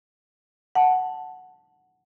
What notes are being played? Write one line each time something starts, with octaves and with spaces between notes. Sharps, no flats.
F#5 A5